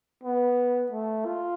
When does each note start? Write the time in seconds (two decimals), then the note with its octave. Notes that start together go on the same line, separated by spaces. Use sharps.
0.23 B3
0.92 A3
1.25 F4